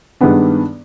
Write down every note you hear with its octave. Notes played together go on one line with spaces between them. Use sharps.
G2 D#3 G#3 B3 D4